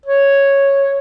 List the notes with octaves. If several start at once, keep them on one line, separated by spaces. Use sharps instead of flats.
C#5